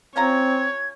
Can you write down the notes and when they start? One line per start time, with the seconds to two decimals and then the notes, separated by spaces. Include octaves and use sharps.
0.16 C4 C#4 F4 C#5 A#5 G#6